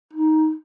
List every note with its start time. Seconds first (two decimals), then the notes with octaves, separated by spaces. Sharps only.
0.13 D#4